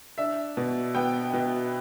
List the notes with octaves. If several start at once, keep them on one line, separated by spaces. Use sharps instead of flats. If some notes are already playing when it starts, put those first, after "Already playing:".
D4 E5
B2
B3 G5
B2